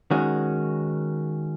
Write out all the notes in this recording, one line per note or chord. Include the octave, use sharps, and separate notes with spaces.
D#3 G#3 C#4 F#4